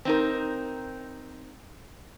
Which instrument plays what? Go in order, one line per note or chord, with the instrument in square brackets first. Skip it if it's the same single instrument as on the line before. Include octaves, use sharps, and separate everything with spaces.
[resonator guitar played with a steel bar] C4 D#4 A#4